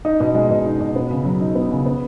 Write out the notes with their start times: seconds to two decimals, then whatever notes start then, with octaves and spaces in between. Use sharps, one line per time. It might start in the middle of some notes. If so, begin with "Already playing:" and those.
0.05 D#4
0.20 B2
0.35 G#3
0.51 B2
0.66 D#4
0.80 B2
0.96 B3
1.11 C#3
1.25 F#3
1.41 D#4
1.55 B3
1.71 C#3
1.86 B3